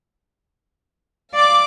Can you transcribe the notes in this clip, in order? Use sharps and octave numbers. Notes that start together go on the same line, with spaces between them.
D5 F5 D6